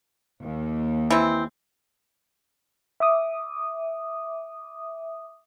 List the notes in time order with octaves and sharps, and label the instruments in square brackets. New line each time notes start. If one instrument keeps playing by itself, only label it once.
[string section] D#2
[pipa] E3 C4
[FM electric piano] E5 D6 D#6